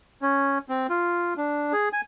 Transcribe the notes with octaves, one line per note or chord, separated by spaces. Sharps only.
C#4
C4
F4
D4
G#4
G#5